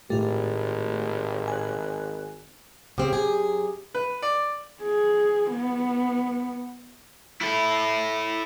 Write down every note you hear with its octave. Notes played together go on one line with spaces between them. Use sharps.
G#1 A2 A3 F4 G4
G#5 F#6
C#3 C4 G4
F#2 G#4
B4
D5
G#4
B3
E4 A4